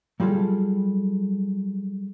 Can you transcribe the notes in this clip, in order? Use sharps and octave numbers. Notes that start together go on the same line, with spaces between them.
F#3 G3 F4 G#4 A4